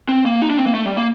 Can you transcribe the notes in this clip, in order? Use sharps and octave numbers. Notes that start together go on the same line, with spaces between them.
C4
A#3
D#4
D4
C4
A#3
A3
G3
A#3